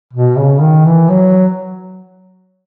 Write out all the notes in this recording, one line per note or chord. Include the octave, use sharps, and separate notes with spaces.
B2
C#3
D#3
E3
F#3